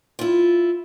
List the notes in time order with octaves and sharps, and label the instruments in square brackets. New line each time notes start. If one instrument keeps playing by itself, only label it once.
[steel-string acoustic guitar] E4 F4